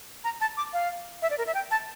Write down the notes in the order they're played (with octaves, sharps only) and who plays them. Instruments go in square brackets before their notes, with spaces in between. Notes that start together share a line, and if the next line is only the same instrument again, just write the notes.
[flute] A#5
A5
D6
F5
E5
D5
A#4
E5
G5
A5